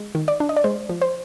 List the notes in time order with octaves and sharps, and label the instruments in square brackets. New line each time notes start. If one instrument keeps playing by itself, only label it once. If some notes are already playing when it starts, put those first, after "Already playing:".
Already playing: [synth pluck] G#3
D#3
D5
D4
D#5
D5
G#3 C5
F3
C5